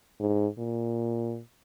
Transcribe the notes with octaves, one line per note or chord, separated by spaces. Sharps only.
G#2
A#2